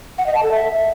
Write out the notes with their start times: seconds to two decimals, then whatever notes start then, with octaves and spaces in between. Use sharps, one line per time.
0.18 F#5
0.27 D#5
0.35 A5
0.43 A4
0.51 E5